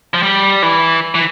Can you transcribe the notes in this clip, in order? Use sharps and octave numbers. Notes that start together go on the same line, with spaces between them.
F3
G3
E3
E3